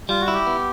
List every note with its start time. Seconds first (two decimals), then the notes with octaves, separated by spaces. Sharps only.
0.09 G3 F4
0.21 F#4
0.28 E4
0.34 G4
0.47 B3